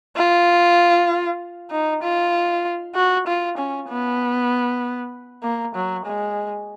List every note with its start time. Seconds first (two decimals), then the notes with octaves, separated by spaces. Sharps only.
0.17 F4
1.71 D#4
2.03 F4
2.96 F#4
3.27 F4
3.57 C#4
3.89 B3
5.43 A#3
5.75 F#3
6.06 G#3